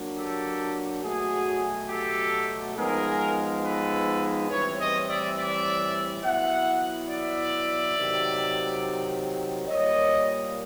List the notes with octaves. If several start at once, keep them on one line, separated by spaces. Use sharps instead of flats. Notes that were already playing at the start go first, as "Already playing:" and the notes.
Already playing: F#3 A#3 D4
G4 A4
B2 F#3 A3 F#4 G#4
G4 A4
F3 G#3 B3 D#4 G#4 A#4
A4 B4
A2 E3 G3 C4 B4 C#5
C#5 D#5
D5 E5
D5 E5
F#3 B3 E4 E5 F#5
D5 E5
C3 D#3 F#3
A#2 G3 A#3 C#5 D#5